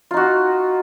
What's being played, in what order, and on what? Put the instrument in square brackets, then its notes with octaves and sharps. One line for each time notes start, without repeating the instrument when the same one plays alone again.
[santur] F4
D#4
F#4